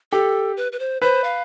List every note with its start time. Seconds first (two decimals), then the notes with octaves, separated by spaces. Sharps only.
0.12 G4 A4
0.57 B4
0.72 B4
0.79 C5
1.02 B4 C5
1.24 F5